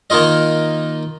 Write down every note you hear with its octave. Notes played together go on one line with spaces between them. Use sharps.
D#3 A#3 D#4 F4 D#5